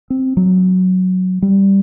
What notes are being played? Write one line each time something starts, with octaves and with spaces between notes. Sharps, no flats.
C4
F#3
G3